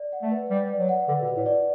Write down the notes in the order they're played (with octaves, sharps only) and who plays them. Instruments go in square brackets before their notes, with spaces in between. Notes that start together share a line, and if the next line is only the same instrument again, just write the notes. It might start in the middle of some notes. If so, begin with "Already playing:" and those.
Already playing: [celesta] D5
F#5
[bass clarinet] A3
[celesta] B4
[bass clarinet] G3 [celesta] B4
[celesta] D5
[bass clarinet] F#3
[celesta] F#5
[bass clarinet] D3 [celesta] B4
[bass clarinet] B2
[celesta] B4
[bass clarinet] A2
[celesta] D5